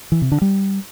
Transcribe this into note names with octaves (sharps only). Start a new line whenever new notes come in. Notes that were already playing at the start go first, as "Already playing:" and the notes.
E3
C3
D3
G3